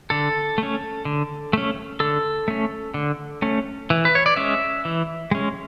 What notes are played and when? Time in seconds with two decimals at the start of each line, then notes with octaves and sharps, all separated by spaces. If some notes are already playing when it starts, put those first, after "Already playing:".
0.10 D3 A4
0.58 A3 C#4
1.05 D3
1.53 A3 C#4
2.00 D3 A4
2.48 A3 C#4
2.94 D3
3.42 A3 C#4
3.90 E3
4.05 B4
4.15 C#5
4.26 D5
4.36 G#3 C#4 E5
4.85 E3
5.31 G#3 C#4